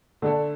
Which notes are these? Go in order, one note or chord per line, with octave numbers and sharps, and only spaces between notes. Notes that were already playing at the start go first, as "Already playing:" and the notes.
D3 A3 D4 A4